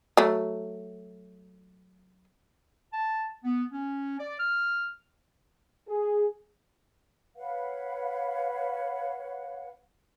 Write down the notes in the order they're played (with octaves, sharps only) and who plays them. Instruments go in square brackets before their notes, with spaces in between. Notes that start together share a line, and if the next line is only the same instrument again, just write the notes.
[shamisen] F#3 A3
[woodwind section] A5
B3
C#4
D5
F6
[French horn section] G#4
[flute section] B4 C#5 F5 F#5